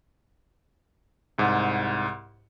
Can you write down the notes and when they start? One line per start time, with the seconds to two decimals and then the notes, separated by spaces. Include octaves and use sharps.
1.38 C2 G#2